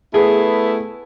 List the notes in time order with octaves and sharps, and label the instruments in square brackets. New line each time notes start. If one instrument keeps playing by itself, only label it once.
[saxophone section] A3 B3 E4 [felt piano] G#4